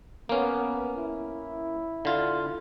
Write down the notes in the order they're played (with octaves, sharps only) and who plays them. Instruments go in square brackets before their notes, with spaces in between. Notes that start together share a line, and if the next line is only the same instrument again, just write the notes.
[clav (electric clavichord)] A#3 C#4 [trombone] B3
[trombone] E4
[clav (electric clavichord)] D3 F4